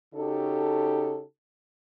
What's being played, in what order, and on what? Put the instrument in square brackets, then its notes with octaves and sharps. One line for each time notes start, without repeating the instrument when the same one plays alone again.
[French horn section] C#3 D#4 F#4 G4 A4